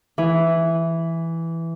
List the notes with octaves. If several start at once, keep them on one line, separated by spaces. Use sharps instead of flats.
E3